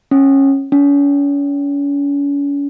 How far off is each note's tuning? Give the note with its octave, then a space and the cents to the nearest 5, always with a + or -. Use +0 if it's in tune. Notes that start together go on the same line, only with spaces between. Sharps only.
C#4 -20
C#4 +40